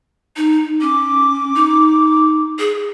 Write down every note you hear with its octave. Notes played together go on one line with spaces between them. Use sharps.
D#4
C#4 D6
D#4
G#4